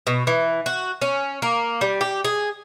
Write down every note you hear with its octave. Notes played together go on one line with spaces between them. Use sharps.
B2
E3
F#4
C#4
A#3
G3
G4
G#4